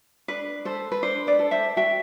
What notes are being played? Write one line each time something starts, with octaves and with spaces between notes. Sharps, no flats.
D4 B4
A4 C5
B4
D4 C5
B4 D5
A4
C5 E5
F#4 E5 G5